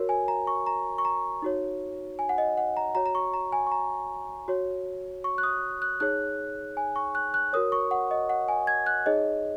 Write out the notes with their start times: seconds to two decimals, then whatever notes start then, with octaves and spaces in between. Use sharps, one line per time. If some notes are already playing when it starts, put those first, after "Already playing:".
Already playing: F#4 A#4 C#5
0.09 G#5
0.28 A#5
0.47 C#6
0.66 A#5
0.98 C#6
1.05 A#5
1.42 D#4 F#4 C#5
2.19 G#5
2.29 F#5
2.38 D#5
2.57 F#5
2.77 A#5
2.95 F#4 C#5 A#5
3.06 A#5
3.15 C#6
3.34 A#5
3.52 G#5
3.66 C#6
3.72 A#5
4.48 F#4 C#5
5.24 C#6
5.38 F#6
5.43 D#6
5.82 F#6
6.00 D#4 G#4 C#5 F#6
6.77 G#5
6.96 C#6
7.15 F#6
7.34 F#6
7.53 F#4 A#4 C#5 D#6
7.72 C#6
7.91 F#5
8.11 D#5
8.29 F#5
8.48 G#5
8.67 G#6
8.86 F#6
9.06 D#4 G#4 C#5 D#5